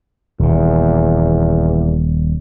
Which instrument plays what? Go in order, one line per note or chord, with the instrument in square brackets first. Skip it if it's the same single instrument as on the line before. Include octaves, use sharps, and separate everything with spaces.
[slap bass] D#1 A#2 [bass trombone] E2